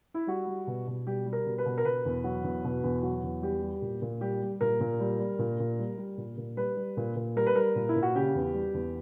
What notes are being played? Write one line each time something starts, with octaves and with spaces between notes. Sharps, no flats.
E4
G3 F#4
G3
B2
B2
G3 G4
G3
A#4
B2
B4
B2
A#4
B2 B4
E2
F#3
E2
B2
E2
F#3
E2
G3 G4
G3
A#2
A#2
G3 G4
G3
A#2 A#4
A#2
G3
G3
A#2
A#2
G3
G3
A#2
A#2
G3 B4
G3
A#2
A#2
G3 A#4
B4
G3 A#4
A#2
E4
A#2
F#4
C#3 G4
E2
G3
E2